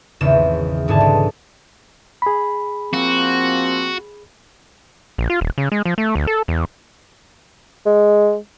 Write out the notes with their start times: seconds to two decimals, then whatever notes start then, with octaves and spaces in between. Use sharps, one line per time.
0.21 G#1 E2 C#3 C4 E7
0.88 G#2 D3 E4 G#4 A5
1.00 B1
2.22 G#4 B5
2.93 F3 A#3 C4 F#4
5.18 A#1
5.30 F4
5.41 D#1
5.58 C#3
5.72 G#3
5.85 F3
5.98 A3
6.15 D2
6.27 A4
6.48 E2
7.86 G#3